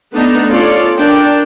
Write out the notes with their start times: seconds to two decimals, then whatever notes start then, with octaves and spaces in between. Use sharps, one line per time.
0.13 A3 B3 D4 D#4
0.49 C#4 F4 A4 C#5 D5
0.98 D4 A#4 D5 G5